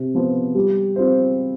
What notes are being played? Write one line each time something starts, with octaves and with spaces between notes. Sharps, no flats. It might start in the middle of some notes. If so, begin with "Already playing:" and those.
Already playing: C3
F3 B3 F4 C5
G3
C4 F4 C5